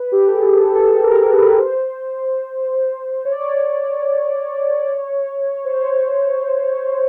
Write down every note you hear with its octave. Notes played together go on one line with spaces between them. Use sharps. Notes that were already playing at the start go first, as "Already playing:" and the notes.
Already playing: B4
G4
A4
G#4
A4
A4
A#4
B4
C5
C#5
D5
C#5
C5
C#5